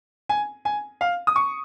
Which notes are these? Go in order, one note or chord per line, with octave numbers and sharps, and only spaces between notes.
G#5
G#5
F5
D#6
C#6